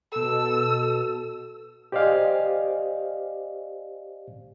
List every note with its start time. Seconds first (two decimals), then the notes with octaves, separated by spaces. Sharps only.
0.12 B2 A4 E6
1.92 G4 C5 D5 D#5 F5 G#5